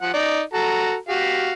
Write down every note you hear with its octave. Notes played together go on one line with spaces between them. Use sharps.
F3 F#5
D#4 D5
F#4 A4 A#5
F#4 G4 F5